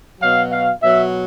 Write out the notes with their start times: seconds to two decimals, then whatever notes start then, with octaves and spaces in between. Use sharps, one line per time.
0.20 B2 F#3 F5
0.51 F5
0.82 B2 F#3 E5